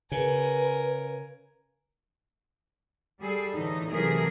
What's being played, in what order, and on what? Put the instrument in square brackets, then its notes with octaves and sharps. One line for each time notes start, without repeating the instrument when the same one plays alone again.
[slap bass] C#3 [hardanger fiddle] A#4 G#5 [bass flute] B4
[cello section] G3 G#4 A4
A2 D3 E3 D#4
C3 E3 F#3 A3 G#4 A#4